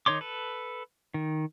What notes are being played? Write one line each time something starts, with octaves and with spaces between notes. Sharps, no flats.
D#3 D#4 C#5 C6 D6
A4 B4
D#3